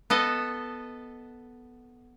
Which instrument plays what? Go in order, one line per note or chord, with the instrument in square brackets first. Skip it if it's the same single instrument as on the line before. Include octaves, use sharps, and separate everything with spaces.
[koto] B3 A4 D#5